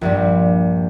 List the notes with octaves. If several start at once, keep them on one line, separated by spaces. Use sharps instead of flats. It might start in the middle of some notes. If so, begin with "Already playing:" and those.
A#1 G2 G3